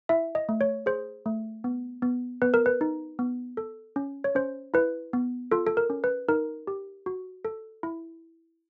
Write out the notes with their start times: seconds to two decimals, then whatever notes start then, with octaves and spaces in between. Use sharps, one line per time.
0.09 E4 E5
0.35 D#5
0.49 A3
0.61 C#5
0.86 G#4 C5
1.26 A3
1.64 B3
2.02 B3
2.42 B3 B4
2.54 A#4
2.66 B4
2.81 D#4
3.19 B3
3.57 A4
3.96 C#4
4.24 C#5
4.35 C#4 C5
4.74 E4 B4
5.13 B3
5.51 F4 A4
5.67 A4
5.77 A#4
5.90 C#4
6.04 B4
6.28 D#4 A#4
6.67 G4
7.06 F#4
7.45 A4
7.83 E4